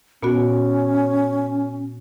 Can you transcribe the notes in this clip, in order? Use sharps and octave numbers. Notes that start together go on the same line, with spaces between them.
A#2 B3 C#4 F#4